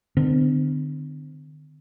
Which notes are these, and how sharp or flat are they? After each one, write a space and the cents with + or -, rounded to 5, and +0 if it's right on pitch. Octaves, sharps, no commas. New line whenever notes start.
D3 +35 C4 -40